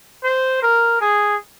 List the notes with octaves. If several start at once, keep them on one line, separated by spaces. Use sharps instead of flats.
C5
A#4
G#4